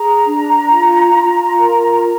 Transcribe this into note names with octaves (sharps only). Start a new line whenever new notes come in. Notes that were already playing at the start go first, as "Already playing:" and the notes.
Already playing: G#4 A#5
D4
F4
F4
A#4
A#4